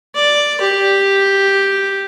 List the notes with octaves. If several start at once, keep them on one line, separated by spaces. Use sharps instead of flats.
D5
G4